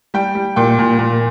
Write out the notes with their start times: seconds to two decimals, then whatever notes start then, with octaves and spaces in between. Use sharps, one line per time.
0.14 G3 G5
0.35 G3
0.56 A#2 G5
0.79 A#2
0.99 A#2